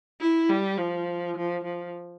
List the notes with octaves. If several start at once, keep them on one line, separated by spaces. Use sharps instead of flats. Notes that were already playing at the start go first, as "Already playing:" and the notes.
E4
G3
F3
F3
F3